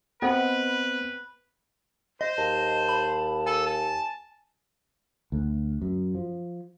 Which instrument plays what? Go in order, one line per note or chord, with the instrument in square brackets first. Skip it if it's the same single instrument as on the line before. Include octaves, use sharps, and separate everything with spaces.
[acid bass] B3 [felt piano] C4 C5 G5 [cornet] B4 [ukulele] D#5 F#5 B5
[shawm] C5 [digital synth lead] D#5
[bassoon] D#2 [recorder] A5
[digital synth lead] B5
[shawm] A4 [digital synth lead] G#5
[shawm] A5
[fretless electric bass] D2
F#2
F3